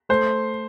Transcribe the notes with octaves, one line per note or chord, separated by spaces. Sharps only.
A3 C5